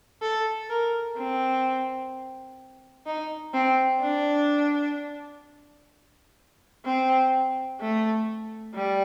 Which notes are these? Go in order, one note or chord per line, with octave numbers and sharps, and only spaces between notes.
A4
A#4
C4
D#4
C4
D4
C4
A3
G3